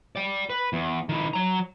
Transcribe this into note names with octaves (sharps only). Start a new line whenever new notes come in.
D5 G5
B4
E2
D#3 E4
F#3 A#5